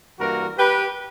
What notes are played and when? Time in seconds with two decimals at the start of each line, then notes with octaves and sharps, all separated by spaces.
0.20 G2 E3 A#3 F#4 A#4
0.58 G4 B4